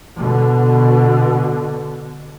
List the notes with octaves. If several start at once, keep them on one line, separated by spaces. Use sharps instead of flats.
B2 D3